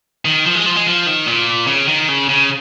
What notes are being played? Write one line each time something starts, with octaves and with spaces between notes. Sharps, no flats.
D#3
F3
G#3
F3
G#3
F3
D#3
A#2
C#3
D#3
C#3
C#3